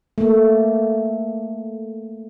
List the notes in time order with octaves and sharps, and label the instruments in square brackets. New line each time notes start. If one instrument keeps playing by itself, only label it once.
[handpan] A3 A#3